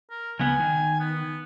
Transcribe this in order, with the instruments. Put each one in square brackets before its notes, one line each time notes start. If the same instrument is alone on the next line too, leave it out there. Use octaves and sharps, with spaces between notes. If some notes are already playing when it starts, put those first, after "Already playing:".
[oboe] A#4
[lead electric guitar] C#2 B3 [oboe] G#5
[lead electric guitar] D#3
[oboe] B3